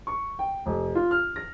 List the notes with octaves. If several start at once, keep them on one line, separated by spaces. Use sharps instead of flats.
C#6
G5
F1
F4
F6
A#6